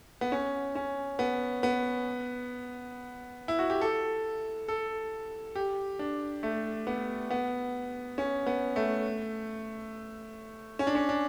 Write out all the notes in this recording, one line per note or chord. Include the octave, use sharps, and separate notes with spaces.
B3
C#4
C#4
B3
B3
E4
F#4
G4
A4
A4
G4
D4
A3
B3
B3
C#4
B3
A3
C#4
D4
C#4
D4